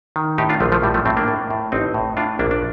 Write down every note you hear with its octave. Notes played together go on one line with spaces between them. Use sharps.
D#3
A2 D#4 G4
D4 F4
A#1 F3 A3
F3 A3
A2 G3
F3 A3
A2 A3 C4
A#3 D4
A2
A2
A1 C4 D#4
A2
A2 D4 F4
A#1 A#3 D4
D4